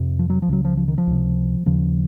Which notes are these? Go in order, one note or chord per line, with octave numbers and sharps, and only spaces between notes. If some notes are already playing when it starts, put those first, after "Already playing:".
Already playing: F2 C3
F3
F#3
F3
C#2 C#3 F#3
F3
F3
D#3
F3
C#2 C3
D#2 C#3 F3